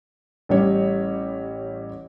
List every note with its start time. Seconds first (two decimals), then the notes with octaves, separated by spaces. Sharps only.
0.49 A1 G3 C#5